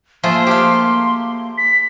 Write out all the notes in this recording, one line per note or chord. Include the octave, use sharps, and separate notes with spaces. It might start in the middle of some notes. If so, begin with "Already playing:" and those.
F3 A3 A#3 G#4 C6
G4 F5
B6